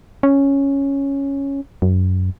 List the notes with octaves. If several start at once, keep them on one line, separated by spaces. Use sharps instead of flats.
C#4
F#2